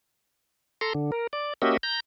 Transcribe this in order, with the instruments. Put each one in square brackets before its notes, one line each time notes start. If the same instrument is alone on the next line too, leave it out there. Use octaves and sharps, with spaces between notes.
[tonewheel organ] A4 A#5 C6
D3
A#4
D5
A#3 C#4 F#4 G4 D#5 E5
A#5 G6